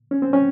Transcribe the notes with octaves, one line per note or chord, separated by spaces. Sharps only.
C#4
C4
C#4